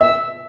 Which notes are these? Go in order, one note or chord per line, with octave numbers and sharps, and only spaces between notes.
E5 E6